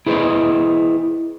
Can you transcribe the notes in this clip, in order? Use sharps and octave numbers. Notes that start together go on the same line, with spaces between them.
E4 G#4 B4 C5 D#5